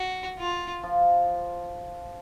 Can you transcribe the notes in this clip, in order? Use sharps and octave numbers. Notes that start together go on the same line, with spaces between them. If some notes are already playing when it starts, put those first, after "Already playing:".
Already playing: F#4
F4
F3 F4